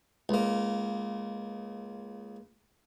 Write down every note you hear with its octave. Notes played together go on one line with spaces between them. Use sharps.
C#2 A#3